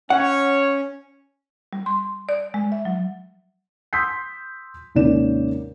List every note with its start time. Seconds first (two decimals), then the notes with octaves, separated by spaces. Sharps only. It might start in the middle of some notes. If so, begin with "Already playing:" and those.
0.10 C#4 C#5 F#5
1.73 G3
1.86 C6
2.29 D5
2.54 G#3
2.72 E5
2.85 F#3
3.93 C6 D#6 E6 G6 B6 C7
4.95 G#1 D#2 C3 C#4 D5 E7